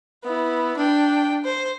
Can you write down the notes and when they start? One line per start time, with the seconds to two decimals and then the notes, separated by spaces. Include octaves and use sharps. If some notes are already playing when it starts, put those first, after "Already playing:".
0.24 B3 E4
0.77 D4 G5
1.45 C5